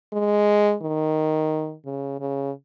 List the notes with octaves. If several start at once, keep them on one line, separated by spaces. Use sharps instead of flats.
G#3
D#3
C#3
C#3